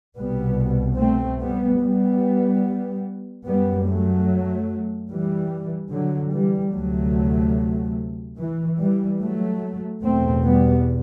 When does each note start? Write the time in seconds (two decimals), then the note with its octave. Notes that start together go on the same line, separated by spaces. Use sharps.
0.17 C2 B2 G3 B3
0.99 A3 C4
1.40 G3 B3
1.82 G3 B3
3.46 F#2 G3 B3
3.87 F#3 A3
5.10 E3 G3
5.92 D3 F#3
6.33 E3 G3
6.74 D2 C3 F#3 A3
8.38 E3
8.80 E3 G3
9.21 F#3 A3
10.03 E2 B2 A3 C4
10.44 G3 B3